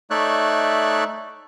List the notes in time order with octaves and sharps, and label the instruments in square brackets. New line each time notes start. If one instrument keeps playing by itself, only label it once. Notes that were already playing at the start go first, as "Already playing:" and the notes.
[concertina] A3 D#4 C#5 D5 E5 F#6